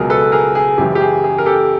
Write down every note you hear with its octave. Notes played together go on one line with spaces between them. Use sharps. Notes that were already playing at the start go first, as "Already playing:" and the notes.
Already playing: C#2 B2 F#3 G#4 A#4
A4 B4
G#4 A#4
G#4
F#2 C#3 E3 G#3 G4
G4
G#4
G#4
A#4
G4 A4